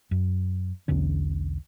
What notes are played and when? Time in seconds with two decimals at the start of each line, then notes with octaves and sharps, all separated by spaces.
0.11 F#2
0.88 B1 E2 D3 C#4